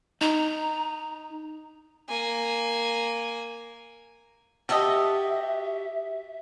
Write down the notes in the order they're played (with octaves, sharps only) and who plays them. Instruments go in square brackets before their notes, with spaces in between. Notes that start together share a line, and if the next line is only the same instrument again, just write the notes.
[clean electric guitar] D#4 [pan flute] A#5
[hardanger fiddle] A#3 G#5
[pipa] B2 A4 D#5 [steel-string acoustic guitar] F#4 G4 [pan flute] E5